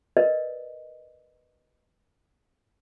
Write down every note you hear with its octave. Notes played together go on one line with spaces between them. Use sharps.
A#4 B4 D5 D#5